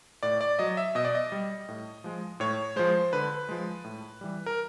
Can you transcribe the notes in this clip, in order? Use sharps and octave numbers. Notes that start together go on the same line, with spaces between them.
A2 D5
D5
F#3 D#5
E5
B2 D#5
D5
D#5
G3
A2
F3 G#3
A2 C#5
F3 G#3 C5
D3 B4
F3 G#3
A2
E3 G3
A#4